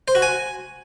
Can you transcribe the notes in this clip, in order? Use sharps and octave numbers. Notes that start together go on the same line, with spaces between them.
C5
F#4
G#5